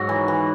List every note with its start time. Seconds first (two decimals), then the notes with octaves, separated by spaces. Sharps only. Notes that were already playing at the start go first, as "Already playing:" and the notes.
Already playing: G#2 F#3 F#4
0.09 E3
0.28 E3